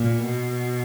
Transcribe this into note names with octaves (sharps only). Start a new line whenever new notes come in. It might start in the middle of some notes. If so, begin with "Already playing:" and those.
Already playing: A#2
B2